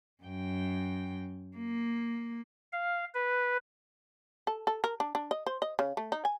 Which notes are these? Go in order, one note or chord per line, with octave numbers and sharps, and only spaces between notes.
F#2 G5
A#3
F5
B4
A4
A4
A#4
D4
D4
D#5
C5
D#5
C#3
A3
D#4
G#5